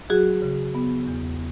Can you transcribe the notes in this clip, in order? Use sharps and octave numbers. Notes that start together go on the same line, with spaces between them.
F#3 F#4 G#4
C#3
B3
E2